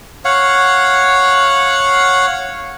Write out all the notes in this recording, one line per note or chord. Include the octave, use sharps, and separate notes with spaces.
C#5 F5 F#5